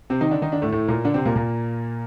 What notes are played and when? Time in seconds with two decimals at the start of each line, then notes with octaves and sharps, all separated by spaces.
0.10 C3 C4
0.21 D#3 D#4
0.31 D3 D4
0.42 D#3 D#4
0.52 D3 D4
0.62 A2 A3
0.72 A2 A3
0.88 A#2 A#3
1.05 D3 D4
1.14 C3 C4
1.25 A#2 A#3
1.36 A#2 A#3